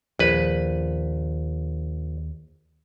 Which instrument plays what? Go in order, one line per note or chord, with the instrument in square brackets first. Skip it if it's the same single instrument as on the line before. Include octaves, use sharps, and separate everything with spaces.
[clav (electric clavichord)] A#1 B4 [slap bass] D#2 F3